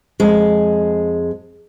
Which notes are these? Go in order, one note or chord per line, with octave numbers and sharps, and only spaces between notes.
F2 G#3